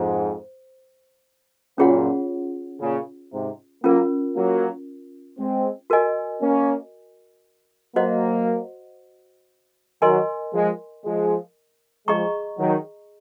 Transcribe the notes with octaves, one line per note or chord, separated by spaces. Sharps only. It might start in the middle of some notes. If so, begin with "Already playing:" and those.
Already playing: F2 G#2 C5
F#2 A#2 C#4 F4 G#4 C#5 F#5
A#2 C#3
G#2 C3
F#3 A#3 C#4 F4 A#4
F#3 A#3
G#3 C4
F#4 A#4 D#5 G#5
A#3 C#4
F#3 A#3 F#4 C5 D#5 F#5
D#3 F#3 A#4 D#5 G#5 C6
F3 G#3
F3 G#3
F3 G#3 G#4 D#5 A#5 C#6
D#3 F#3